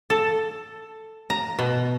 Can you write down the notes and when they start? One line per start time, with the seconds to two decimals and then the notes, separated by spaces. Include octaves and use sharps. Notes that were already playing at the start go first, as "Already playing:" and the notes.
0.10 A4
1.30 A#5
1.59 B2